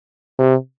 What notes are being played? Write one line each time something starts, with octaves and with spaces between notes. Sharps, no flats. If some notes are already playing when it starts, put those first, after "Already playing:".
C3